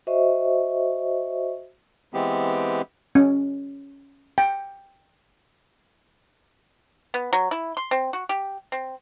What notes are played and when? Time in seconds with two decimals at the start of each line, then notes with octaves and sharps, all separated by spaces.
0.07 F#4 C5 C#5 D#5 E5 C#6
2.14 E3 G#3 B3 C4 G4
3.15 C#4
4.38 G5
7.14 B3
7.33 F#3
7.51 E4
7.77 C6
7.91 C4
8.13 F#4
8.29 G4
8.72 C4